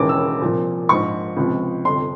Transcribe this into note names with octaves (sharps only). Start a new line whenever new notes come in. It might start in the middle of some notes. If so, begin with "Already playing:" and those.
Already playing: E1 D#2 C#3 E3 D6
E6
C2 A#2 F3
A#1 G#2 F3 C#6
C#2 C3 F3
G1 F2 C3 C6